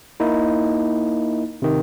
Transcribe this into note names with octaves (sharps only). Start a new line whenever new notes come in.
A#3 D#4 E4
C3 D#3